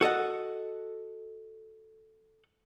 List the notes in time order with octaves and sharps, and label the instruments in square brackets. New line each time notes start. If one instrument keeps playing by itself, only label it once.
[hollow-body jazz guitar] F#4 A4 D#5 F#5